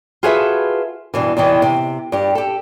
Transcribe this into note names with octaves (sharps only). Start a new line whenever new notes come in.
F4 F#4 G#4 A4 B4 E5
G2 B2 E3
E2 C3 D#3 E3
C3
G2 G4
G4 A4